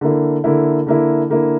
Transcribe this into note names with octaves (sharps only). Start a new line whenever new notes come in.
D3 A#3 E4
D3 A#3 E4
D3 A#3 E4
D3 A#3 E4